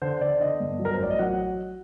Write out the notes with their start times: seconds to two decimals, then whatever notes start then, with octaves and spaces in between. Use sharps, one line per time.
0.02 D3 C5
0.21 D3 D5
0.40 D3 D#5
0.60 G2
0.79 F#3
0.85 A#4
0.94 C5
1.00 A1 D5
1.10 D#5
1.19 F#3 F#5